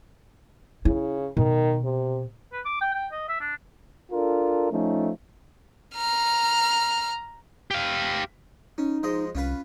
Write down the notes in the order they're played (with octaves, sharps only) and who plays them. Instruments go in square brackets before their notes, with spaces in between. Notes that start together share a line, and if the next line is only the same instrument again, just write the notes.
[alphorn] C#3 [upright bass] E4
[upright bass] B2 [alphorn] D#3
[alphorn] C3
[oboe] B4
D6
G5
G5
D#5
E5
D4
[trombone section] D4 F4 A4 A#4
F3 A3 C#4 D#4
[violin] A#5 F6
[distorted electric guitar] G4 F5
[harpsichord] C#4 [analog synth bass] D#4
[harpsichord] F3 G#3 D#5
[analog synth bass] C2 [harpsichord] C#4 F4 B4